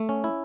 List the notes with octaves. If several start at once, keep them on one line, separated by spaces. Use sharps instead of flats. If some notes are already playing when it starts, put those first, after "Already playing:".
Already playing: A3
C#4
E4